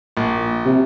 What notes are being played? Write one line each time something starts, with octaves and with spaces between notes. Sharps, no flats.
A#1
C3